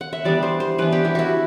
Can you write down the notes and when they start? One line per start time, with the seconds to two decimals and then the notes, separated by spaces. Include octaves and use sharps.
0.01 F#5
0.13 E5
0.24 E3 G3 B3 D4 D5
0.43 C5
0.60 C5
0.78 E3 G3 B3 D4 B4
0.92 G4
1.05 E4
1.15 E4 F#4